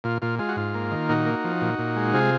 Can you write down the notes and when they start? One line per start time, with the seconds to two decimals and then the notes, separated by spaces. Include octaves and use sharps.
0.04 A#2 F4
0.22 A#2 F4
0.39 G#3 F4
0.49 F#4
0.56 G#2 F4
0.75 A#3
0.91 D#3
1.09 A#2 D#4 F#4
1.26 A#3
1.44 F3
1.62 A#2
1.79 A#2
1.96 G#3
2.13 C3 F4 G#4